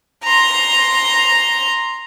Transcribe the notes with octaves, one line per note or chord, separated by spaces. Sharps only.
A#5 C6